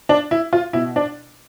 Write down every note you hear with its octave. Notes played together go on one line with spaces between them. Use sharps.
D4
E4
F4
B2 E4
D4